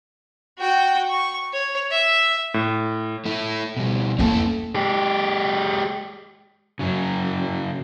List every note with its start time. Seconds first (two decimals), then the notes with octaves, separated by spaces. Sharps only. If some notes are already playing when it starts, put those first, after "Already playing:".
0.59 F#4 G5
1.09 C#6
1.53 C#5
1.91 E5
2.54 A2
3.25 A3 E4
3.77 B2 G3
4.19 F2 A#3 C#4 E4 A4
4.75 G#3 G4
6.79 F#2 C#3 F#3